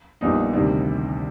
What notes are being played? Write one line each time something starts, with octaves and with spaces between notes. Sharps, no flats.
A#1 A#2 G3 B3 D#4
D2 C3 D#3 G3